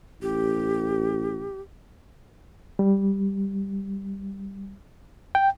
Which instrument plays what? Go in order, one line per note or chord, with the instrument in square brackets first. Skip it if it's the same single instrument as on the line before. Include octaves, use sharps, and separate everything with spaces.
[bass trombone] A1 [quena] G4
[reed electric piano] G3
G5